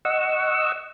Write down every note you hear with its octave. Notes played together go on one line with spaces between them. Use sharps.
D#5 F#5 C#6 E6